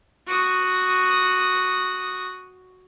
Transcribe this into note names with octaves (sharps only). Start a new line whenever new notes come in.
F#4 D#6